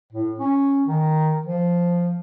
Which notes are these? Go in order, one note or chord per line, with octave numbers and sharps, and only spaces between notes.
A2
C#4
D#3
F3